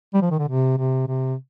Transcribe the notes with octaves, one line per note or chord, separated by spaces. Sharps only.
G3
F3
D#3
D3
C3
C3
C3